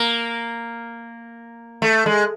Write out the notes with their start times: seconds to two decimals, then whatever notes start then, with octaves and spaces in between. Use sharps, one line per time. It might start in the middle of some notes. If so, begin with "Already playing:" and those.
Already playing: A#3
1.82 A3
2.06 G#3